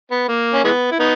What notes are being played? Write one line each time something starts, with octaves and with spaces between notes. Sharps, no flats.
B3
A#3
C#4
E3 G#3 B3
E4
B3 D#4